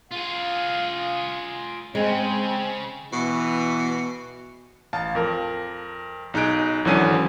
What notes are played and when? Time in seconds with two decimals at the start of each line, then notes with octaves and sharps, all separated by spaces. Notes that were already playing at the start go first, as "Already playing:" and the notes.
0.11 F4 G#4 F5
1.95 C#3 G#3 C4
3.13 B2 E3
4.93 A1 F5 A5
5.15 F2 A#4
6.34 B1 D#4 G#4 F#6 D7
6.85 G#1 D3 E3 F#3 C#4 D#7